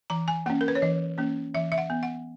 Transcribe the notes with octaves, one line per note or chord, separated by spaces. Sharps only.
E3 A#5
G#5
A#3 C#4 F#5
A#4
B4
C#5
E3 D#5
A#3 C#4
E3 E5
E5
F#5
B3
F#5